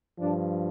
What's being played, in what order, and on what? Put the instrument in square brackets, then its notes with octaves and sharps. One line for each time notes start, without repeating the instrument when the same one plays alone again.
[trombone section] G2 F3 D4